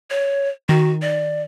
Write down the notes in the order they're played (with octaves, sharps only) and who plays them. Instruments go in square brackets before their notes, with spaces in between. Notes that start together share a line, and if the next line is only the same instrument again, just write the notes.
[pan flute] C#5
[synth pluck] D#3 [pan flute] F#4
[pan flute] D5